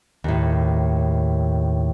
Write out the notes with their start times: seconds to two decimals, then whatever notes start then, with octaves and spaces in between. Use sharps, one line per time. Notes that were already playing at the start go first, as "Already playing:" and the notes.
0.24 D#2 A2